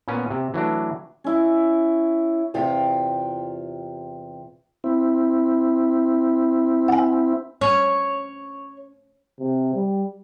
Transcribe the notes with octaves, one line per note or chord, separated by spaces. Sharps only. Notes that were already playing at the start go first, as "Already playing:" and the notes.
A#2 B3 C#4 G#5
C3
E3 F#3 A3 D4
C#4 E4
E2 C3 F4 G4
C4 E4
F#5 G#5
C#4 C#5
C3
G3